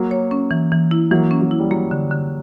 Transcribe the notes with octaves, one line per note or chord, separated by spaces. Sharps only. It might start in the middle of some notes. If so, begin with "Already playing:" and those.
Already playing: F#3 A#3
C#5
C#4
E3
E3
E4
E3 F#3 A#3
C#4
F#3
E4
G3
F#3 A#3
D3
D3